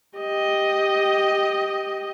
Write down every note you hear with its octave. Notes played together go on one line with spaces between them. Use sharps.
G4 D#5